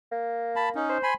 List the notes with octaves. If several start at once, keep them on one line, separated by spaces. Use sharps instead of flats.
A#3
A5 B5
C#4 D#4
C5
G#5 B5 C6